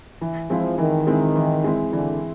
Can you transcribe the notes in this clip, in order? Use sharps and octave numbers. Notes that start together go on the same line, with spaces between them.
E3
F3 G#3 C4 E4
D#3 E3
G#3 C4 E4
E3
G#3 C4 E4
D3 E3